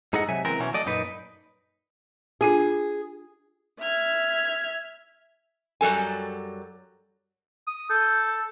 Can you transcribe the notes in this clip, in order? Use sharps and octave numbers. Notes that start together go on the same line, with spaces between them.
G#2 D#4 G#4 A4 D#5 F#5
C3 F#3 E5 G#5
C#2 E3 B3 C4 A#4
B2 E3 F#3 C#4
F#3 A3 D5 D#5
F#2 A#2 D#4 B4
D4 F4 G#4 A4
E5 F6 G#6
F#2 F#3 G3 A4 G#5
D#6
A4 G6